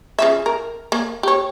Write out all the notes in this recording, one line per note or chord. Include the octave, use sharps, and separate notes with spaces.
C#3 F3 E5
A#4
A#3
G4 C#5